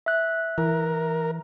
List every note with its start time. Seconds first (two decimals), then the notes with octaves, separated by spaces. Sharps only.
0.06 E5 F#6
0.58 E3 A#4